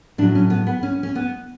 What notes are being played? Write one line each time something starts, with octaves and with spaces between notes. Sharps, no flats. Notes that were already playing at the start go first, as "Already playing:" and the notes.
A2 F#3 D4
C#4
B3
B3
C#4
C#4
B3